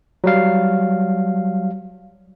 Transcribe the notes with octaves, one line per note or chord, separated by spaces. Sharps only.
F#3 G3 F5